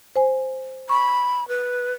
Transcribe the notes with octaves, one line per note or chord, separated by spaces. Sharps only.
C5 G#5
B5 C#6
B4